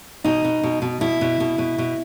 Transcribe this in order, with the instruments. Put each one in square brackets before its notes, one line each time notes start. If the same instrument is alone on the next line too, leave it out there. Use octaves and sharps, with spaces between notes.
[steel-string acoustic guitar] B2 D#4
B2
B2
B2
B2 E4
B2
B2
B2
B2